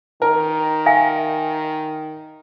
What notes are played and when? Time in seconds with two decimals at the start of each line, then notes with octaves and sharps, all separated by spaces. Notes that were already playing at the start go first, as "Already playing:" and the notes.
0.22 D#3 A#4
0.86 E5 F5 G#5